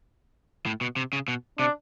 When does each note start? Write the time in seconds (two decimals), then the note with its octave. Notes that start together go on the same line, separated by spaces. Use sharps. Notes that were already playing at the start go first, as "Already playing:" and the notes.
0.66 A2
0.81 B2
0.96 C3
1.13 C#3
1.28 B2
1.59 C3 D4